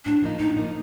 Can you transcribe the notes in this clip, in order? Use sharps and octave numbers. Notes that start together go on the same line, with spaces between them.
A2 D4
F3 A#3 D#4
A2 D#4
F3 A#3 D#4